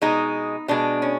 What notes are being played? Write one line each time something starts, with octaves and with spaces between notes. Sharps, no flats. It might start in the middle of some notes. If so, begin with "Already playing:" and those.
B2 G#3 D#4
B2 G#3 D4
C#4